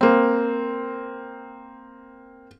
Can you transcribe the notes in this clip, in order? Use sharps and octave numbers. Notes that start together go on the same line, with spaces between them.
A#3 C4